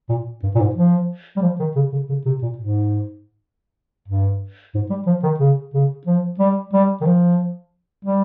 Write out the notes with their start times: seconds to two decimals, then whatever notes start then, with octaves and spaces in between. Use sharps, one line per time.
0.09 A#2
0.43 G2
0.55 A#2
0.60 G#2
0.75 F3
1.37 G3
1.42 F3
1.59 D#3
1.76 C#3
1.92 C#3
2.09 C#3
2.26 C3
2.42 A#2
2.58 G#2
4.08 G2
4.74 G#2
4.90 G3
5.07 F3
5.23 D#3
5.40 C#3
5.74 C#3
6.07 F3
6.39 G3
6.73 G3
7.01 D#3
7.06 F3
8.05 G3